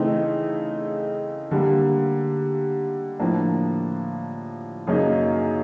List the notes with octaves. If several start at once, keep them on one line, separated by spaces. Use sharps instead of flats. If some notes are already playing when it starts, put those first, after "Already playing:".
Already playing: C#3 E3 A3 C4 D#4
D3 G3 A#3
A2 F3 A#3 D4
F#2 C#3 F#3 A#3 D#4